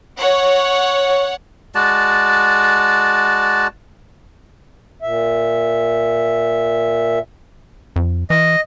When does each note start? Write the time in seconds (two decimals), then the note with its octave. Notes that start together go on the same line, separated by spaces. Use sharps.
0.18 C#5 F#5
1.75 G#3 F#4 D5 A5
5.02 A#2 E5
7.96 F2
8.30 E3 D#5